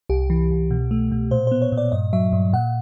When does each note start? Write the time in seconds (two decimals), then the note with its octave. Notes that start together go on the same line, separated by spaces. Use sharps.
0.09 C2 G4
0.30 E3
0.51 C2
0.71 B2
0.91 A3
1.11 B2
1.31 A#2 C5
1.47 B3 C5
1.62 C#5
1.72 A#2
1.77 D5
1.92 G2 D#5
2.13 F#3 E5
2.33 G2
2.53 A#2 F#5